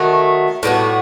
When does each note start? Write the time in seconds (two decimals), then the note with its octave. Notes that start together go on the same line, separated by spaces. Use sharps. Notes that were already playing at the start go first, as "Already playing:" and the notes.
Already playing: D#3 F#3 A3
0.63 A2 G3 B3 F#4